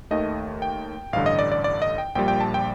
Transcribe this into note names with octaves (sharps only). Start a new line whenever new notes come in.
D#2 D#3 A3 D#5
G5
A1 G2 D3 F5
D#5
D5
D5
D5
D#5
G5
A#1 A#2 G3 G5
G5
A5
G5